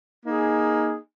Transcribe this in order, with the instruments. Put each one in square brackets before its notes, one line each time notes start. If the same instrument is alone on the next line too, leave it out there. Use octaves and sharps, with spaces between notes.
[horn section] A#3 D#4 G#4